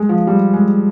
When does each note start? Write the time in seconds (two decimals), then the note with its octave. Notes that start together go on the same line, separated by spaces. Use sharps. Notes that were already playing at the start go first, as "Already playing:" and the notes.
Already playing: G#3
0.09 F3
0.27 G3
0.54 G#3